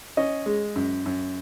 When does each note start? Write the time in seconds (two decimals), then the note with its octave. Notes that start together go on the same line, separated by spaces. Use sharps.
0.17 C#4 D#5
0.46 G#3
0.76 F#2
1.06 F#2